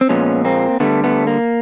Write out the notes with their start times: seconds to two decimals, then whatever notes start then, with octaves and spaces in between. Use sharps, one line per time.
0.01 C4
0.09 A#2 F3 G#3 B3 C#4
0.45 A#3 C4
0.80 D3 G3 A3 B3
1.04 A3 B3
1.27 A#3